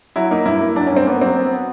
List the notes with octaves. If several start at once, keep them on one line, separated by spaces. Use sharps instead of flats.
F#3 E4
A#3 D#4
G2 E4
A#3
F#3 D4
C#4
G2
C4
A#3 B3
F#3 C4
B3
B3